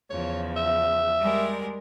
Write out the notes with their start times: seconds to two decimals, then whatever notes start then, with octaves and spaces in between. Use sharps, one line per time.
0.10 E2 C#3 F3 C#5
0.56 E5
1.20 G3 G#3 A#4